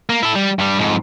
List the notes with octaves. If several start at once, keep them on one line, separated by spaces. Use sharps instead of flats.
A#3
E4 A4
G3
G2 G3
F2 G#2